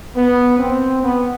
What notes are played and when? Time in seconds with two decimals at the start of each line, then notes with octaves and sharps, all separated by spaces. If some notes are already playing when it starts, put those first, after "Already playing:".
0.16 B3
0.59 C4
1.01 B3